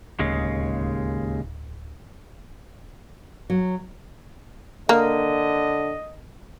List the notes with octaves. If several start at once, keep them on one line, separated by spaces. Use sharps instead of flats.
D1 D#2 C#3 G#3
F#3
D3 A#3 D#5